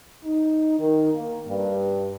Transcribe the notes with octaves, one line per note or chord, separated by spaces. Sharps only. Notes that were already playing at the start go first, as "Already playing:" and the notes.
D#4
D#3
A#3
G2